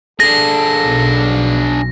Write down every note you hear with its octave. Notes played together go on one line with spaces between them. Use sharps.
D4 G#4 A4 A#6
B1 B2